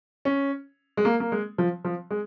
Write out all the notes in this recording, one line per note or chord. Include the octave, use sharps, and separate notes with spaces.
C#4
G#3
A#3
A#3
G#3
F3
F3
G#3